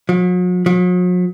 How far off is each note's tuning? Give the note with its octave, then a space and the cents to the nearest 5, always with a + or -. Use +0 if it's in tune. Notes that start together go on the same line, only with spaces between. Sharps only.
F#3 -45
F#3 -45